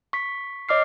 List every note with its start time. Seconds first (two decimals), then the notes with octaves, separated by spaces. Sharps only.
0.13 C#6 B6
0.69 C#5 D#5 D6 F6 C7